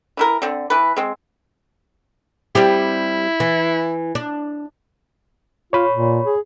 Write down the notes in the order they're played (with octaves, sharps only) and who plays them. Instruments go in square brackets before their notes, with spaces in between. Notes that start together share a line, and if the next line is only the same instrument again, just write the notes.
[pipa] E3 E4 A#4
D3 C4
E3 B4
G#3 C4
[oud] G3 C4 G4 [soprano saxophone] E4
[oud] E3
D4
[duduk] F4 [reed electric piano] C#5 B5
[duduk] A#2
G#4